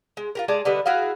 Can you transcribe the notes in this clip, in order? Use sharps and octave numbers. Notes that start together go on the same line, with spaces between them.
G#3
F4 G4 A#4
G#3 G#4 D5 A5
D3 G3 B4 D#5
E4 F#4 G#4 F5